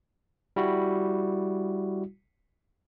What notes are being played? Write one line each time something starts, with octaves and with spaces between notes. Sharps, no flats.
G3 E4 F#4